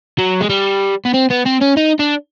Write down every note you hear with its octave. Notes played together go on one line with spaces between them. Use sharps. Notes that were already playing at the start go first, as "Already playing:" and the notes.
F#3
G#3
G3
B3
C4
B3
C4
C#4
D#4
D4